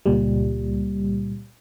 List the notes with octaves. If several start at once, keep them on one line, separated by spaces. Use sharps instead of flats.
C#2 A#2 G3